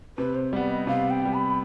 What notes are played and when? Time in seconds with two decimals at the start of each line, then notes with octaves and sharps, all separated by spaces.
0.18 C3 B4
0.35 C5
0.52 G3 B3 D5
0.69 D#5
0.87 C3 F5
1.10 G5
1.22 G3 B3
1.34 B5